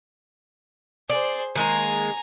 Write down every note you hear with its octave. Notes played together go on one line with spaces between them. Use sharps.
G#4 C5 D5
D#3 G#3 A#3 G#5 A#5